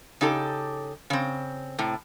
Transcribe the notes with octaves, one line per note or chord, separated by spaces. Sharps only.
C#3 D#4 G4 A4
C#3 C4
A2 C3